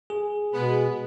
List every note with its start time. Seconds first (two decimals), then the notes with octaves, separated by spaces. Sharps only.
0.10 G#4
0.53 B2 G#3 B3